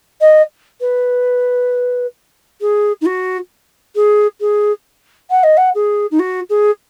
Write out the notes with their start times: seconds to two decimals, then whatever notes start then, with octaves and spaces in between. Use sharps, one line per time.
0.21 D#5
0.80 B4
2.61 G#4
3.01 D#4
3.06 F#4
3.95 G#4
4.40 G#4
5.30 F#5
5.43 D#5
5.57 F#5
5.75 G#4
6.11 D#4
6.19 F#4
6.49 G#4